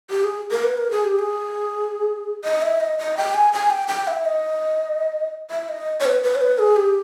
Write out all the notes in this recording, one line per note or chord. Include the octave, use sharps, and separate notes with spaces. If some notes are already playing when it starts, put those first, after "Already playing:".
G4
G#4
A#4
B4
A#4
G#4
G4
G#4
D#5
E5
D#5
D#5
G5
G#5
G#5
G5
G5
E5
D#5
E5
D#5
C#5
B4
B4
C#5
B4
G#4
G4